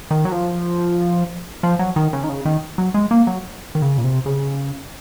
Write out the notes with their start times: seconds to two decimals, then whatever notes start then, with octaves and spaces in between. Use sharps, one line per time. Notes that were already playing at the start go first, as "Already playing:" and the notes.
0.11 D#3
0.25 F#3
0.32 F3
1.63 F3
1.79 F#3
1.96 D#3
2.13 C#3
2.24 D#3
2.29 C#3
2.45 D#3
2.78 F#3
2.94 G#3
3.11 A#3
3.27 F#3
3.75 D#3
3.82 C#3
3.98 A#2
4.04 C3
4.26 C#3